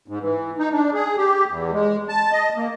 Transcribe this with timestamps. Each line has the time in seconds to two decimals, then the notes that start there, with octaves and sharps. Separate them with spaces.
0.08 G#2
0.21 E3
0.59 D#4
0.72 D4
0.94 G#4
1.17 G4
1.48 E2
1.73 G#3
2.09 A5
2.32 D#5
2.56 A#3